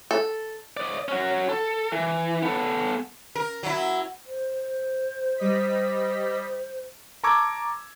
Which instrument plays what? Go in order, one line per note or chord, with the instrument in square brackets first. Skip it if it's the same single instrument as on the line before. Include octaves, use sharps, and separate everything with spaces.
[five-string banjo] A4
[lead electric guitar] D5 D#5
C#4 F#4
A4
E3
B3 A4
[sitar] A#4
F#3 E4
[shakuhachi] C5
[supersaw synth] G3 D#5 B6
[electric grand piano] A5 A#5 C#6 D6 E6 G#6